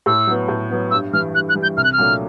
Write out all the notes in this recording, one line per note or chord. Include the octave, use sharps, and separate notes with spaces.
A2 E6
F#3 B3
A2
F#3 B3
G2 E6
E3 G3 F6
G2 F#6
F#6
E3 G3
G6
C2 F6
F#6
F6
A#2 F#3 A3 D4